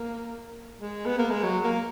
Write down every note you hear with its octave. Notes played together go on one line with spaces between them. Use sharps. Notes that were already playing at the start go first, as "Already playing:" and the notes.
Already playing: A#3
G#3
B3
A#3
G#3
F#3
A#3